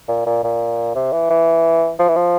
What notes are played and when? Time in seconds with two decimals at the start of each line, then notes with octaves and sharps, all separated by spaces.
0.09 A#2
0.26 A#2
0.44 A#2
0.95 C3
1.12 E3
1.30 E3
1.99 F3
2.08 E3
2.16 F3